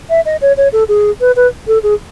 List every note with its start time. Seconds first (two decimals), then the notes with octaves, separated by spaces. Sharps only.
0.10 E5
0.26 D#5
0.42 C#5
0.57 C#5
0.73 A4
0.88 G#4
1.21 B4
1.36 B4
1.67 A4
1.83 G#4